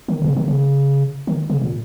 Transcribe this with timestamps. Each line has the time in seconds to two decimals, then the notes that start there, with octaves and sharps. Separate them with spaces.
0.08 D#3
0.22 A#2
0.26 C#3
0.36 D#3
0.48 C#3
1.27 D#3
1.50 C#3
1.62 A#2